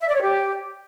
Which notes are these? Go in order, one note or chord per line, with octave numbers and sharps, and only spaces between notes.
E5
D5
C#5
G4